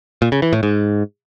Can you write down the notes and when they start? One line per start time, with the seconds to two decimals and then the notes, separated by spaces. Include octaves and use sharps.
0.22 A#2
0.32 C#3
0.42 E3
0.53 A2
0.63 G#2